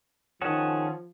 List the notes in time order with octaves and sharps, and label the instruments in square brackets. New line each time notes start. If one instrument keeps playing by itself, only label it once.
[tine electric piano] D#3 C#4 [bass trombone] F3 [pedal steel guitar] G#4 F#5 A5